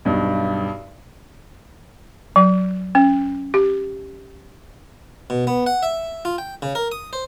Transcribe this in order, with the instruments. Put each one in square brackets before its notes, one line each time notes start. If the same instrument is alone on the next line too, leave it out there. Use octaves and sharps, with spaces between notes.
[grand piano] B1 G2
[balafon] F#3
C#4
G4
[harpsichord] B2
B3
F#5
E5
F4
G5
C#3
A#4
D#6
C5